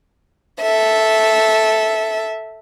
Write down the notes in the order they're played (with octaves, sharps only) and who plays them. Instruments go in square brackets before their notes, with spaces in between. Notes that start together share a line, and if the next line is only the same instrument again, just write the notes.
[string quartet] A4 E5